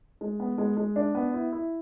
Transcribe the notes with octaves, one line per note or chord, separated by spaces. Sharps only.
G#3
B3
G#3
G#3
D4
B3
E4
E4